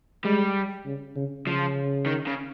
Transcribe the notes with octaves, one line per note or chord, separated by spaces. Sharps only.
G3 G#3
C#3
C#3
C#3 F3
D#3
C#3